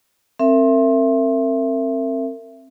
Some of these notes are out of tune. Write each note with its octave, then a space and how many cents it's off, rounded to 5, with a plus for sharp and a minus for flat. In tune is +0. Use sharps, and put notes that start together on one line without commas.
C4 +25 A#4 -30 E5 +20